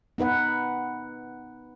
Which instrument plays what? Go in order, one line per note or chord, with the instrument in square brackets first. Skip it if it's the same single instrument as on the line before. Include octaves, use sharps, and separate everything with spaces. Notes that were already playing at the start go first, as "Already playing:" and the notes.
[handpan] B3 D#4 B4 F#5